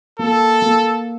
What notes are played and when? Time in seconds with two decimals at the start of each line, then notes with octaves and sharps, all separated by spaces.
0.19 A#3 A4
0.62 A#3